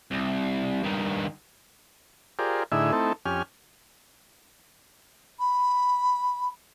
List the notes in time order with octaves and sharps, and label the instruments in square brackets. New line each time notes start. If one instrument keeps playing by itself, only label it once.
[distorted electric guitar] C2
G2 D#3
[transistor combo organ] F4 G4 G#4 A#4 C5 D5
A2 D3 D#4 E4 G#4 E5
A3 C4 D#4 E4 A4
F2 C#4 G4 G#5 F6
[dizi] B5